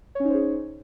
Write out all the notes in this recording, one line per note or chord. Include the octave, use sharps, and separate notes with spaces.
C#4 D#4 G#4 C5 C#5